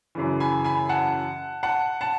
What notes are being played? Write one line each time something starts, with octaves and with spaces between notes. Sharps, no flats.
F#2 C#3 E3
G#5 B5
G#5 B5
F#5 A5
F#5 A5
F#5 A5